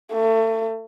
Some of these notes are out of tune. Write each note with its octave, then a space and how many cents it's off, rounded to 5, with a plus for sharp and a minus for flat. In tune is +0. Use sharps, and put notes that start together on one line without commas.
A3 +30